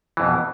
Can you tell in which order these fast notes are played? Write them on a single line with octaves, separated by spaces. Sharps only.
E3 F2 B2